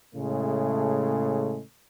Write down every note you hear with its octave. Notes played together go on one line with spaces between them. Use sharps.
A2 C#3 G#3 A3